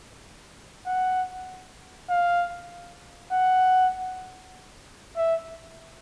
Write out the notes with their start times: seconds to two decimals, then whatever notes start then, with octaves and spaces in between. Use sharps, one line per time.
0.87 F#5
2.10 F5
3.33 F#5
5.17 E5